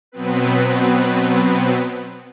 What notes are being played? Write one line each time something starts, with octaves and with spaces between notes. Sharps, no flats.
B2 F#3 B3 C4 B4